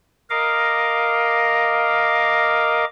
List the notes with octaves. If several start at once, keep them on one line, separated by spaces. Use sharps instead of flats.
A#4 D#5 F5 D6